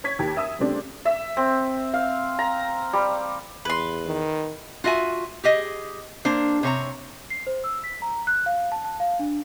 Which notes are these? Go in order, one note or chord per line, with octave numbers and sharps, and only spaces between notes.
C#5 C#6 G#6 B6
D#2 G4
E5 D#6 E6
C#3 G3 A3 C4 D4 G4
E5
C4
F5
A#5
G3
E2 B4 C6
D#3
F4 F#4 E5 G#5
G4 G#4 D#5
A#3 D4 C5
C3 C#5 A#5
C7
C5
E6
B6
A#5
F#6
F5
A5
A5
F5
D4